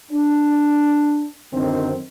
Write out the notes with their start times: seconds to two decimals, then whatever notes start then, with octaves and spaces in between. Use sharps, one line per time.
0.11 D4
1.53 F#2 D3 D#3 C4